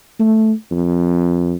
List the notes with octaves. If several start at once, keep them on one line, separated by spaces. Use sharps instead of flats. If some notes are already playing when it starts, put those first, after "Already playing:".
A3
F2